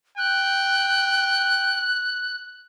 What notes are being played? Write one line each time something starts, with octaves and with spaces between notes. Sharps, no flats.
G5 F#6